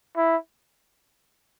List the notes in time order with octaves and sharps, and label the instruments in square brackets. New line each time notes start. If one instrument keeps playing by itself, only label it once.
[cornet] E4